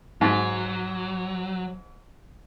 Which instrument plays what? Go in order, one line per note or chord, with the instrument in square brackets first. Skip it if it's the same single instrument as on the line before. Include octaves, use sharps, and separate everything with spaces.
[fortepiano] G#2 [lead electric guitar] F#3